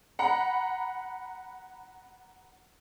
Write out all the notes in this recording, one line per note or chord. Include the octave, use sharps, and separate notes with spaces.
F#5 A#5 B5